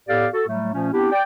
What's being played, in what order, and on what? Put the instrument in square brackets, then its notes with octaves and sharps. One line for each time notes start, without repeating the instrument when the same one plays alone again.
[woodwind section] A2 B3 G4 A4 D5 F5
F#4 A4
A2 F#3 G3 A3
A#2 F3 A3 C#4
B3 C4 D4 E4 G4
D5 G5